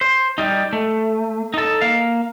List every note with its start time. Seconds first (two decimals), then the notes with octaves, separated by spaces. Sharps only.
0.01 C5
0.38 G3 D#4
0.73 A3
1.54 D#4 A4
1.81 A#3 F5